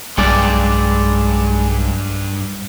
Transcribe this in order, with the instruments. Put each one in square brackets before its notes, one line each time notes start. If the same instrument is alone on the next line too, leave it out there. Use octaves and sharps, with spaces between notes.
[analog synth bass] B1 [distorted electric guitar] G2 [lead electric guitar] G#3 D5